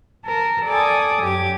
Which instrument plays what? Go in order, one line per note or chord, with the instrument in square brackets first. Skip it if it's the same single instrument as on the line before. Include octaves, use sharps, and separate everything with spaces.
[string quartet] A#4 A5
A4 D5 G#5 D6 D#6
F#2 G4 D6 G#6